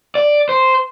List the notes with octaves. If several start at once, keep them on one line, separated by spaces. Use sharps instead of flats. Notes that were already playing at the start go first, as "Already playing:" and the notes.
D5
C5